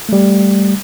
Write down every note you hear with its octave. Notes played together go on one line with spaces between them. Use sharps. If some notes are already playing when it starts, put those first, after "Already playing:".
G3 A3